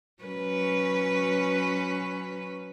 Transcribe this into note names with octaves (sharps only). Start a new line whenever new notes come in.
F#3 C#4 B4